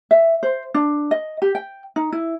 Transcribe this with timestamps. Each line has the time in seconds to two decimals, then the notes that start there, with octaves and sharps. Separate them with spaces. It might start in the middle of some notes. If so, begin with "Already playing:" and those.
0.11 E5
0.43 C5
0.74 D4
1.11 D#5
1.42 G4
1.55 G5
1.96 D#4
2.12 E4